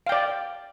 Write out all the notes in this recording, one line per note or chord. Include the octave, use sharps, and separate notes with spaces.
D5 F5 G5